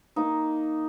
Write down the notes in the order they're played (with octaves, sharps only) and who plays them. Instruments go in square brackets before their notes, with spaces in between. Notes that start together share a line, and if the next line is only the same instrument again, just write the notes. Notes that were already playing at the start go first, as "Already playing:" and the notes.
[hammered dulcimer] A#3 D#4